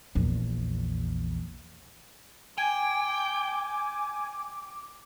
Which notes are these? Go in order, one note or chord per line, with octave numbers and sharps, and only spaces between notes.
A#1 E2
G5 G#5 D6